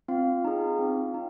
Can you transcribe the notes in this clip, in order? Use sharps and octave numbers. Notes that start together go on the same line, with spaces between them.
C4 F4 F5
D#4 G#4
C4
D#4